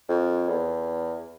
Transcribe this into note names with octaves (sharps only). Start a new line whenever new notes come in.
F2
E2